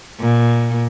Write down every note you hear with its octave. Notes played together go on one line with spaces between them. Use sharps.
A#2